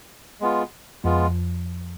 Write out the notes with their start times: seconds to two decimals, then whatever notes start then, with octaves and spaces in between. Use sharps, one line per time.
0.40 G#3 B3 F4
1.04 F2 F3 G#3 B3 F4